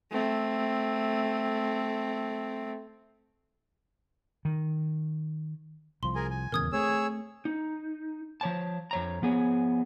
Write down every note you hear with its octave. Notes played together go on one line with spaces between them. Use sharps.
A3 C4
D#3
C2 F3 C6
G#4 A#4 G#5
G#5
D#1 E2 C#3 A#4 D#6 G#6
A3 C4 G#4 C#5 E6
D#4
F3 C#5 A5
F2 C#5 A#5
F3 B3 G#4 C#5